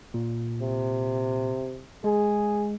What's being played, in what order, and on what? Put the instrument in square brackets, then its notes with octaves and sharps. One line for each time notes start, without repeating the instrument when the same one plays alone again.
[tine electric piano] A#2
[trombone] C3
[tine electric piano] G#3 [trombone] G#4